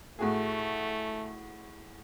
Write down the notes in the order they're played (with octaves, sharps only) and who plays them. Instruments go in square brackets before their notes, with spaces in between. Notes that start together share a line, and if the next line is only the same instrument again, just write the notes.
[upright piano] A2 F#4 G#4 [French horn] A3